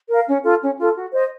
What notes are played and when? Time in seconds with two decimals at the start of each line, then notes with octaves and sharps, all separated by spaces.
0.10 A#4 F5
0.28 C#4
0.44 F4 A4
0.61 C#4
0.79 F4 A4
0.96 F#4
1.13 C5 D#5